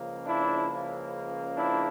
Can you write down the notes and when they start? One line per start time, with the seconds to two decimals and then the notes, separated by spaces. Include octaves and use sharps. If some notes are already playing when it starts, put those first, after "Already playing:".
Already playing: C#2 C#3 F3 A#3
0.25 D4 E4
1.56 D4 E4